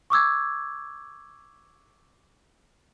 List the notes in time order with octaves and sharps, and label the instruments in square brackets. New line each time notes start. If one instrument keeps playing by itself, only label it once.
[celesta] C#6 D6 E6 G#6